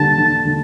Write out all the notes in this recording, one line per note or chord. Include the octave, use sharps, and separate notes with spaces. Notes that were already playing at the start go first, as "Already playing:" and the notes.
Already playing: D3 G3 A#3 A5
D3
D3